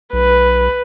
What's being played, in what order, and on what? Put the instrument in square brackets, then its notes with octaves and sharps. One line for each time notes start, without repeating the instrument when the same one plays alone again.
[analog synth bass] B1 [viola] B4